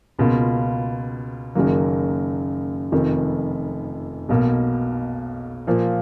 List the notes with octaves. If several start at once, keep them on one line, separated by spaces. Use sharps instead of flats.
C#2 B2 A#3 F4
F#1 F#2 D#3 F#3 A#3
F1 F2 D#3
B1 B2 A#3
A#2 F3 A#3